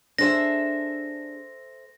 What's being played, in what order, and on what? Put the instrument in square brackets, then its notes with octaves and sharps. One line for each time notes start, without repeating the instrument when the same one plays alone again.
[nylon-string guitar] D4 G#4 [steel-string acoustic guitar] A4 C5 E5 [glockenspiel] A#6